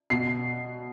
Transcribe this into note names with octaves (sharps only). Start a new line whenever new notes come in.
B2 C7